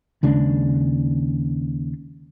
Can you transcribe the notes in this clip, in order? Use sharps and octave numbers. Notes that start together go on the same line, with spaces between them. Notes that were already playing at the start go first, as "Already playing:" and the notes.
D#2 C#3 G#3 D4